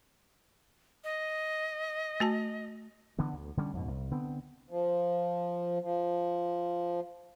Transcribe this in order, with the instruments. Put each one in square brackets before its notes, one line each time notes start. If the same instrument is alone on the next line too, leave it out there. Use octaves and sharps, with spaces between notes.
[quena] D#5
[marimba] A3 F#4 A5
[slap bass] D3 E3 B3
D2
D3 G3 C#4
F2 G#2 B2
C2
D3 B3 C4
[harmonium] F3
F3